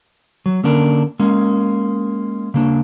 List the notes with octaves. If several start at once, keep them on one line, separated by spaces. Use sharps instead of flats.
F#3
D3 A#3 C#4 D4 A#4
G#3 A#3 C#4
C#3 A#3 D4